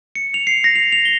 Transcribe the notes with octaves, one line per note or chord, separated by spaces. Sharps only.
C#7
F7
C7
A#6
F7
F7
G7